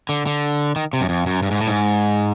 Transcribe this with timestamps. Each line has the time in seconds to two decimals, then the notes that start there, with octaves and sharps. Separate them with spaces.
0.09 D3
0.26 D3
0.76 D#3
0.93 C3
1.01 F#2
1.09 F2
1.26 F#2
1.42 G2
1.51 G#2
1.60 A2
1.68 G#2